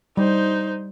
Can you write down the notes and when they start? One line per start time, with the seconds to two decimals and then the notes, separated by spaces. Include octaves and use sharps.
0.17 G3 D#4 C5